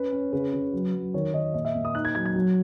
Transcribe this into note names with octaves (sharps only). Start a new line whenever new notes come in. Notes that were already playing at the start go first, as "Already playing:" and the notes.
Already playing: C#4 B4
C#4
C#3 B4
C#3
F#3
F#3
D#3 C#5
D#3 D#5
A#2 D#5
E5
A#2
D#6
D#4 F#6
G#6
F#3 G#6
G#6
F#3